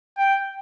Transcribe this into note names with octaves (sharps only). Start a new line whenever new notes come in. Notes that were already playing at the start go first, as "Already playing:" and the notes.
G5